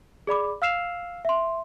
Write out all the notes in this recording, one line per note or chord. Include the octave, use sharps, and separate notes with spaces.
G#4 D5 B5 D6
F5 E6 F6 C7 E7 F7
E5 C6